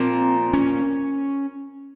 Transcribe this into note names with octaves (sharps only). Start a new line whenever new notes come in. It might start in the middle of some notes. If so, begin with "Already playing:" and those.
Already playing: A#2 F3 A#3 C4
C#4